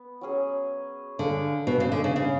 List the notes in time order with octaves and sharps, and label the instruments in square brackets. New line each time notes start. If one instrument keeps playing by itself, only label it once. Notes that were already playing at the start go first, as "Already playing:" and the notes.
Already playing: [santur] B3
F#3 C#4 G#4
[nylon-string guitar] D3 [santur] D4 G#4 D5 F5
[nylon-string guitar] B2
C#3
D3
C#3
[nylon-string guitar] C#3 [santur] B3 F#4 C#5